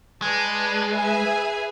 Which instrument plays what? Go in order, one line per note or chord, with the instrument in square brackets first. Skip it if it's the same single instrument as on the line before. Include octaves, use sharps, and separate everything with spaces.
[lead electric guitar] G#3 [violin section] G#4 B4 D5 A5
[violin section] G#4 B4 E5 G#5